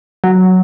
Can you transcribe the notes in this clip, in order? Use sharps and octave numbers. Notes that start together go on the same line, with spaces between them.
F#3